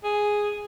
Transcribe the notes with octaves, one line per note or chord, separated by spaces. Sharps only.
G#4